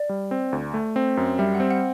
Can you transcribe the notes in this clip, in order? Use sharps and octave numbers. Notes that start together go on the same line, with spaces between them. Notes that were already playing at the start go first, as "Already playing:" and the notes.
Already playing: D5
G3
C4
D2
A3
C4
F#2
G3 E5
F#5
C4
F#5